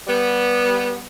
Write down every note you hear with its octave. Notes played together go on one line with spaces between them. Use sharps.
G3 B3